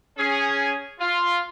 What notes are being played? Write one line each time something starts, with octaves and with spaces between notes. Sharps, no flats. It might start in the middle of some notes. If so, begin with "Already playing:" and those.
C#4 G#4
F4